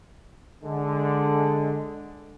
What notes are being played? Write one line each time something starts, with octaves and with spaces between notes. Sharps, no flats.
D3 G#3